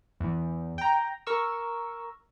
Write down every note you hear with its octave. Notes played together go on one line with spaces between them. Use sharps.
E2
G5 A#5
A#4 C#6 E6